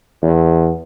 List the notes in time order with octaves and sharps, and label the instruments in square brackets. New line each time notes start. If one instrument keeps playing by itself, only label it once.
[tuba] E2